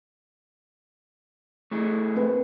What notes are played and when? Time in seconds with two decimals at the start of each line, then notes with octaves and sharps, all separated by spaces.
1.71 A3 E4 G#4
2.16 A#3 C4 B4